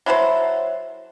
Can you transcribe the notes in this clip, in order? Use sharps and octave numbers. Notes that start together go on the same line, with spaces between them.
F#3 E4 A4 C5